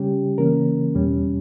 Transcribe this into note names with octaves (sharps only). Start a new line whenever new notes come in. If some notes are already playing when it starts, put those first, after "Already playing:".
Already playing: C#3 G3 C#4 G4
C#3 E3 A#3 C#4 A#4
E2 B2 G3 C#4